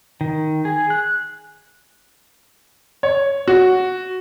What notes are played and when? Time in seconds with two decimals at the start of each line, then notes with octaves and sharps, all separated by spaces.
0.21 D#3
0.65 G#4
0.90 F#6
3.03 C#5
3.48 F#4